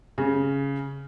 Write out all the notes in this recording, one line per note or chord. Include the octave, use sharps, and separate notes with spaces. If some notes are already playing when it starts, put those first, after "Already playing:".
C#3